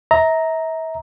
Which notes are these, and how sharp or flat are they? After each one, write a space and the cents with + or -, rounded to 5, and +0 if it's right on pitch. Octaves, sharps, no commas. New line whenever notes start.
E5 -35 A#5 +0